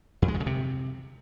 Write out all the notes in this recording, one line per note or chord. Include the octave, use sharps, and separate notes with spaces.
F2
G#3
D#3
C#3
C3